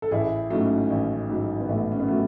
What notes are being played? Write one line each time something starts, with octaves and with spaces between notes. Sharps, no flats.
A4
A1 E4 G#4
G#2 F#3 A3 C#4
A1
G#2 F#3
B3
A1 A3
C#4
B3
F#3 A3